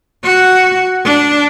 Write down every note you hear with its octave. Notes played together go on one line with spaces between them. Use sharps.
F#4
D4